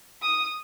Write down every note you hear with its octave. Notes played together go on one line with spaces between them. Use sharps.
D#6